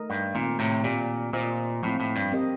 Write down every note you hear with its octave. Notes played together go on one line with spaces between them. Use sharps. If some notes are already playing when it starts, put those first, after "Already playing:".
Already playing: A3 D#4 A#4 D#5
G2
A#2 D#3 A3 C4 D#4
A2 C3
A#2 C4 G4 D5
A#2 A#3 F4 C5 D#5
A2 F3 C4 F4
A2
G2
C4 G4 A#4 D#5